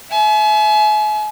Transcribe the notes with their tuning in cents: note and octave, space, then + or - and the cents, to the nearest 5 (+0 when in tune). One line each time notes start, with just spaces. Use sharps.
E5 +15 G#5 +40